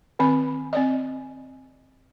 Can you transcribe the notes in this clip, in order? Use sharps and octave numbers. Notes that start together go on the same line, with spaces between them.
D#3 C4 B5
C4 D5 D#5